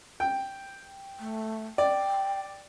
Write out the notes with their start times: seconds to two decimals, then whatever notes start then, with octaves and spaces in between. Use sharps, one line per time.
0.20 G5
1.20 A3
1.78 D5 G5